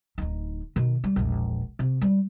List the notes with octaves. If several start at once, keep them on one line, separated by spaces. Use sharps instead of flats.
D1 D#4
B2 D#3
G3
E1 A#1
C3
G3